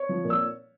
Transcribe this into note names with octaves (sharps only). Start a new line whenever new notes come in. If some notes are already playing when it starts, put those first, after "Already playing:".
Already playing: C#5
F3
A#2
E6